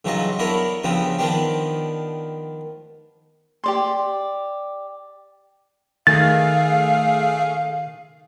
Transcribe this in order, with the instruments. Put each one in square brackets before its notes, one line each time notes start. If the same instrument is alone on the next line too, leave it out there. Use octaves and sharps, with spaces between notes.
[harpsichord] G2 C#3 E3 F#3 F4 D#5
B3 D4 E4 A#4 C#5
G2 C#3 F3 B3 C4
D#3 F3 B3 D4 G4
[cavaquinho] G4 D5 C6
[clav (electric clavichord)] D#3 [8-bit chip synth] A3 G#4 [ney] F5 [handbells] A6